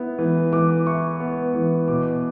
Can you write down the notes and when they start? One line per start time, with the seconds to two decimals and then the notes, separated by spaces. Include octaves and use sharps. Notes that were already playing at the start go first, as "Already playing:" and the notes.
Already playing: B3 E4
0.19 E3
0.53 E3 D6
0.86 E4 C#6
1.20 B3
1.54 E3
1.88 B2 D6